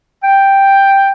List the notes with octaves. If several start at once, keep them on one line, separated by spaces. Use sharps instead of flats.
G5